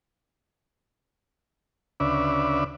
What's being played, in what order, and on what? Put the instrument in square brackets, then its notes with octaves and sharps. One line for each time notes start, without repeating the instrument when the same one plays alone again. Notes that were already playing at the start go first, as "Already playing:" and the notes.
[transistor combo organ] D2 C#3 D4 B4 D5 E5